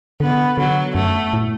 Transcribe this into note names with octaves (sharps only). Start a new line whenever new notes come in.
D3 B3
D3 F#3
F#2 A3
A2